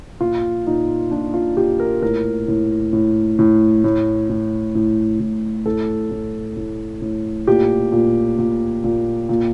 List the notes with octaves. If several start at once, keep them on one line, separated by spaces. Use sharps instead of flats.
A#2 F4
A#2 D#4
A#2 D4
F4
A#2 G4
A#4
A2 A#4
A2
A2
A2
A2
A2
A2
A2
A2 A4
A2
A2
A2
A#2 G4
A#2
A#2
A#2
A#2